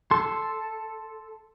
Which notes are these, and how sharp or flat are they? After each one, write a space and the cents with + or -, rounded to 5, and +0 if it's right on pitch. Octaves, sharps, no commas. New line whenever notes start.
A4 +0 C6 +0